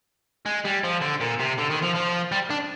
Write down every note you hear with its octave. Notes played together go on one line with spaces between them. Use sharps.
G#3
G3
F3
D3
A#2
C3
D3
D#3
F3
F3
G3
D4